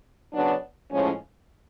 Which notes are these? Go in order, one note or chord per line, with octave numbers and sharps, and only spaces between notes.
C#3 F#3 B3 D4
A2 F3 G#3 C#4